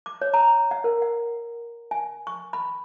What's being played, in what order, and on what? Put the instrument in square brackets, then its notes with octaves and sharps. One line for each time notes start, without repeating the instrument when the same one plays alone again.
[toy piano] D6
C#5
A#5
F#5
A#4
F#5
G#5
C#6
B5